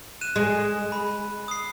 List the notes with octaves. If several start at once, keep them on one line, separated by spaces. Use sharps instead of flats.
F#6 D#7 E7
G#3
B5
D#6 C7